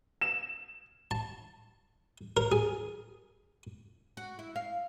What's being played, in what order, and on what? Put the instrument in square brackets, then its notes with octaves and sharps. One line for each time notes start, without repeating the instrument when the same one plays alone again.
[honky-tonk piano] E7
[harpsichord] A5
A#4
G#4
[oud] F#4
E4
F5